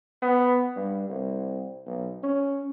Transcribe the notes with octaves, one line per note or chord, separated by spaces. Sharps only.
B3
G2
C2
B1
C#4